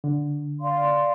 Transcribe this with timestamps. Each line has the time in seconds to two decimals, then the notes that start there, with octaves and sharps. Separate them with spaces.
0.04 D3
0.60 D5 F5 C6